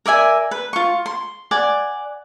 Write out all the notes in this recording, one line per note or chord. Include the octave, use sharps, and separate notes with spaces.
A#4 D5 E5 G#5
B4
F4 C#6
C6
D5 F#5 G#5